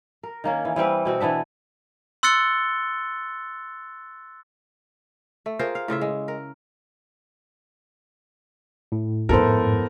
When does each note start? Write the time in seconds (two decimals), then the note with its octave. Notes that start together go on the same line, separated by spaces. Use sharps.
0.23 A#4
0.44 D#3 A#3 C#4
0.65 E3
0.76 E3 G3 C4 B4
1.05 B2 C4 F#4
1.20 E3 B3 D4 E5
2.23 C6 E6 F#6 A6 C#7 G7
5.46 A3
5.59 F4 G#4 A#4 C5
5.75 F5
5.88 A2 C#3 F4 E5
6.01 G#3
6.28 A#4
8.92 A2
9.29 F2 G#2 B3 E4 A4 A#4 C5